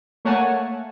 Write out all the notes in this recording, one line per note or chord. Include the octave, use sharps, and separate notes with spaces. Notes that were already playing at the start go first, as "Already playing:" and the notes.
A3 A#3 C#5 F#5 G#5 A5